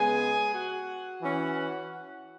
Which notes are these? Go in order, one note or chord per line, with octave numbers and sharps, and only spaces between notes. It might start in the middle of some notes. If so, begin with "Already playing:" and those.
Already playing: C#3 G#3 B3 G#4 G#5
F#4 F#5
E3 C#4